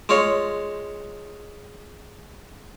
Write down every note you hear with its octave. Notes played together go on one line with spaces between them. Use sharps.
G#3 F4 C#5